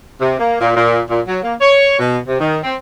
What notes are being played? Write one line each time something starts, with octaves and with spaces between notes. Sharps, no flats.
C3
A#3
A#2
A#2
A#2
F#3
A#3
C#5
B2
C3
D#3
C4